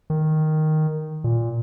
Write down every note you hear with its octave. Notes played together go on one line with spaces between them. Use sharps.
D#3
A#2